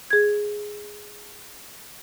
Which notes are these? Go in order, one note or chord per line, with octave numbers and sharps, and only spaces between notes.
G#4 G#6